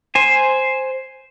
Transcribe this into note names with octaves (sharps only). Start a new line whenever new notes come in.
C5 G#5